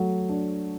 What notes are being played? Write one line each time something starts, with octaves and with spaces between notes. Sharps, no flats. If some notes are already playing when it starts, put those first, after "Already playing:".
Already playing: F#3 A3
D4